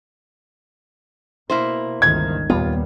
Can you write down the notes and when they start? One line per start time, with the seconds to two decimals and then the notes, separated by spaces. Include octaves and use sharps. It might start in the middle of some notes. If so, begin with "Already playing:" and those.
1.50 B2 A#3 E4 C5
2.02 G1 C#2 D#3 G#6
2.50 D#2 A#2 G3 B3 F4